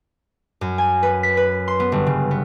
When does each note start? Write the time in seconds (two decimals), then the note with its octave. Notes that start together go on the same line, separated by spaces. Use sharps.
0.61 F#2
0.78 G#5
1.03 B4
1.23 B6
1.37 B4
1.68 C6
1.80 B3
1.92 G1
2.07 C#3
2.31 B3